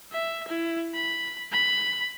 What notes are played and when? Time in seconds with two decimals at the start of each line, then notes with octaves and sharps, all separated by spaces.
0.12 E5
0.48 E4
0.95 B5
1.52 B5